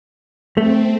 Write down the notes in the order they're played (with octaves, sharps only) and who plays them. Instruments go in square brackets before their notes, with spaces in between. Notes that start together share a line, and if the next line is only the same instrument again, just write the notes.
[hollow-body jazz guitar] A3 [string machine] C4